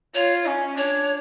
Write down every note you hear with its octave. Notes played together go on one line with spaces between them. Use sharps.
F4 C#5
C#4
D4 C#5